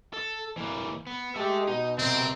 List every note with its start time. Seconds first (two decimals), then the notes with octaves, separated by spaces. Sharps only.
0.14 A4
0.57 E3 A#3
1.07 B3
1.35 G#3 G4 A4 E5
1.67 B2 D#4
1.98 C3 C4 A#4